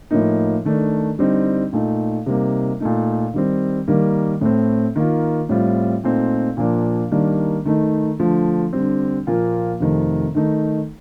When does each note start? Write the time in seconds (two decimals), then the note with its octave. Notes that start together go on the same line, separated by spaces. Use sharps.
0.11 A2 F3 A#3 D#4
0.65 D#3 A3 D4
1.19 D3 G3 C4 D#4
1.73 A#2 A3 D#4
2.26 C3 G3 A#3 D#4
2.80 A#2 A3 D#4
3.34 D#3 G3 C4
3.88 D#3 G3 A#3
4.41 A2 A3 C4
4.96 D#3 A#3 F4
5.49 A2 G3 C4 F4
6.04 A#2 A3 C4 D#4
6.57 A#2 F3 A#3 D4
7.12 D#3 G3 A#3 D4
7.65 D#3 A3 D#4
8.20 D3 F3 A3
8.73 D3 G3 C4
9.27 A#2 F3 A#3 F4
9.80 F2 C3 D#3 A3
10.35 D#3 A3 D#4